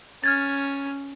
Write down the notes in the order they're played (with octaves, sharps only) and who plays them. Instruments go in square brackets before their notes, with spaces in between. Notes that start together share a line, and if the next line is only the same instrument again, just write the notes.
[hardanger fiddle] C#4 [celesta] F6 G#6 A6